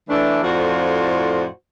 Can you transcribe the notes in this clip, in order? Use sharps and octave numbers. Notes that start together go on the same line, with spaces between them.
E3 A3 D4
F2 A2 F4 F#4 C5 D5